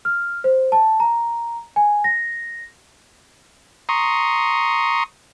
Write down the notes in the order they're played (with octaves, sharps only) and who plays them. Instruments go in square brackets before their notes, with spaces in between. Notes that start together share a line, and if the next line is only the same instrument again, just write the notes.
[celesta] F6
C5
A5
A#5
G#5
A#6
[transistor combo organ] A#5 C6 C#6 D#6